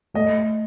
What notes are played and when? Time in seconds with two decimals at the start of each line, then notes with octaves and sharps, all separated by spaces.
0.14 A3 D#5